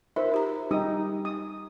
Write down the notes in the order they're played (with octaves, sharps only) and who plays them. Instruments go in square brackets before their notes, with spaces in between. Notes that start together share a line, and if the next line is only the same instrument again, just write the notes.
[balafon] D#4 F4 A#4 [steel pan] C5 E5
[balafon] D#4 G4 A#5
[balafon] G3 [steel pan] D#4 G4 D#6
[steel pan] D#6